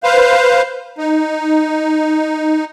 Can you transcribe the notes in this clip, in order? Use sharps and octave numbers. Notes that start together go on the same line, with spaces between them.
B4 C5 F5
D#4